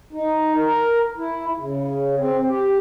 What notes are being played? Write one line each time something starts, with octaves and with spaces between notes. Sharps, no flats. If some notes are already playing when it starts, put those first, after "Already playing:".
D#4
A#4
E4
C#3
C4
G4